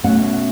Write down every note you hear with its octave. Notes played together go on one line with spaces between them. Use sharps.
B2 A3 C#4 F#5